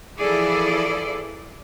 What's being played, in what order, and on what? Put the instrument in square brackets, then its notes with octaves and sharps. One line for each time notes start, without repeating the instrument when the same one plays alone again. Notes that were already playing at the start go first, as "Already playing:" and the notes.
[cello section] E3 F3 E4 G#4 A4 D5